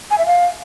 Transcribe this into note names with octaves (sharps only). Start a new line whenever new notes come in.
G#5
E5
F5